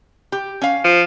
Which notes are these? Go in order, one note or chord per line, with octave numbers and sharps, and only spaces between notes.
G4
C#4 F5
F3